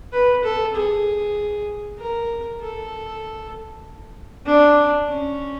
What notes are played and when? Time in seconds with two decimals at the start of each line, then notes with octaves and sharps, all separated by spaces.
0.13 B4
0.44 A4
0.75 G#4
1.99 A#4
2.61 A4
4.46 D4
5.08 C#4